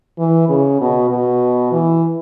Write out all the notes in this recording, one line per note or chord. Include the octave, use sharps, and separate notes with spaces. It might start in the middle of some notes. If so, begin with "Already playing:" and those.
E3
C#3
B2
B2
E3